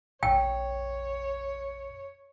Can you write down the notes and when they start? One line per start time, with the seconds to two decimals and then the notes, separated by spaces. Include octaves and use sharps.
0.23 F1 A#1 C#5 G5